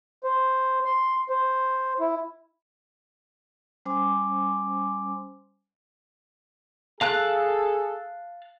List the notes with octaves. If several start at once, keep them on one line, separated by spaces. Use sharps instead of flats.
C5
C6
C5
E4
G3 C#4 C5 G#5 C6 D6
G#4 A4 F5 A5 F#6